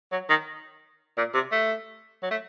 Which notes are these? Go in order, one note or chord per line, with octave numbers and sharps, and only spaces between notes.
F#3
D#3
A#2
C3
A3
F#3
A3